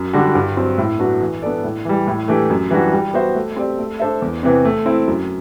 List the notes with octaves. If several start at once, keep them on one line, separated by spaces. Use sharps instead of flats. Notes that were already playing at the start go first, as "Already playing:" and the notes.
Already playing: F#2
D3 G3 D4 F#4
G2
F#3 C4
A2
F#3 B3 D4 F#4
E3
B3 D4 A4 D5
A2
E3 G3
A2
E3 A3 D4 G4
F#2
E3 G3 D4 F#4
G3
B3 F#4 C5 E5
A3
C4 G4 D5
A3
D4 A4 C5 E5
E2
C3 E3 B3
A3
C4 E4
F#2